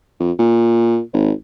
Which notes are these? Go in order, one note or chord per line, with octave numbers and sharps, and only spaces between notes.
F2
A#2
G#1